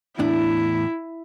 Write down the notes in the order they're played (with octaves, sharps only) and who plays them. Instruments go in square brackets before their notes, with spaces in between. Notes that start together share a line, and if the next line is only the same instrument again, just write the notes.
[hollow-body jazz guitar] E2 A2 D4 [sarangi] E4